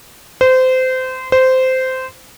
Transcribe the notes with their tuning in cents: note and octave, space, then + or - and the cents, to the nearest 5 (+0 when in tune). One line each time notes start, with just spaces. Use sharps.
C5 -25
C5 -15